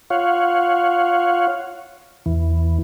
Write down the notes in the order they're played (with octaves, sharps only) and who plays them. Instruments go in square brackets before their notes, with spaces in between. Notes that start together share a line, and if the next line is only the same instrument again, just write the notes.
[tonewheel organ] F4 C#5 F5 F#5
E2 E3